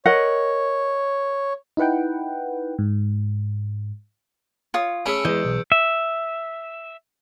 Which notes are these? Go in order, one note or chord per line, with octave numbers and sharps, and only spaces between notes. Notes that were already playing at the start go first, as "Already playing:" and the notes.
A#4 C#5 D#5 F#5
D#4 E4 B4 F#5 G5
G#2
F4 C#5 D#6
A3 C#4 G#4 B5 E6 C#7 D7
E2 E3 G#3 D#5 G6
B1
E5